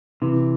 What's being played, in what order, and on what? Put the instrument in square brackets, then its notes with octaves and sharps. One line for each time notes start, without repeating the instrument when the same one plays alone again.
[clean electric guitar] C3 [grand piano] E3